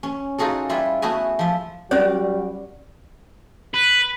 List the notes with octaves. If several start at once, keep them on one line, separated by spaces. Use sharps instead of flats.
C#4
D#4 F4 F#4 G#4 A4
G3 E4 F4 B4 E5
A3 B3 F#4 G#4 B4 G#5
F3 E5
F#3 G3 C#4 F#4 A#4 C#5 D5
B4